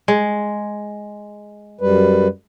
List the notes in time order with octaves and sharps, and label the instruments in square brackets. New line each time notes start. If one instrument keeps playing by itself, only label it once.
[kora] G#3
[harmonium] F#2 G3 B4